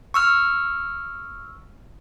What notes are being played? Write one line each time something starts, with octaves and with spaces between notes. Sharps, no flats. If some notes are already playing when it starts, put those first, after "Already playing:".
C#6 E6 F6